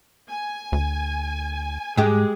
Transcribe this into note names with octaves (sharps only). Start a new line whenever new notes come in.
G#5
D2
G#2 G#3 G4 G#4